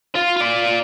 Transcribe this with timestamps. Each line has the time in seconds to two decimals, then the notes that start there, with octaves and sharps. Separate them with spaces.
0.15 F4
0.36 F4 D5